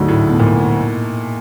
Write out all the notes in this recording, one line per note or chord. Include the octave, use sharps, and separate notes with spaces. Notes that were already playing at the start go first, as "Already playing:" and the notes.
Already playing: D2 G#2 D3 F#3
A2
B2
A#2